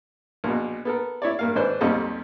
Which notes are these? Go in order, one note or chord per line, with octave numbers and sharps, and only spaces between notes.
A#1 B2
B3 A4 A#4
E4 C#5 D5
G2 A#3 F5
G#1 G#3 D4 B4 C5
B1 F2 A#2 G3 A4 D#5